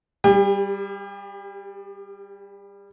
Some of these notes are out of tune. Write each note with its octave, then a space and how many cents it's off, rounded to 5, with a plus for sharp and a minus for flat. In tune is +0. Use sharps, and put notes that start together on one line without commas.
G3 +0 G4 +40